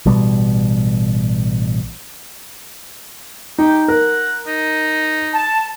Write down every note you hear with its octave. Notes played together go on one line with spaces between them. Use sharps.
A1 B2 G3
D#4 G4
A#4 F#5
D#4
A5